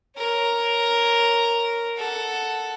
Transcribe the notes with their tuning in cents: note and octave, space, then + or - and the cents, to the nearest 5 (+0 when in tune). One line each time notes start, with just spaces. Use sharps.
A#4 +0 C#5 +0
A4 +0 F#5 +0